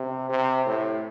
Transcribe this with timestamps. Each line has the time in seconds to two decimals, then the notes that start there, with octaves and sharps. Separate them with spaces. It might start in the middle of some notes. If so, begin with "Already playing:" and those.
Already playing: C3
0.30 C3
0.66 A2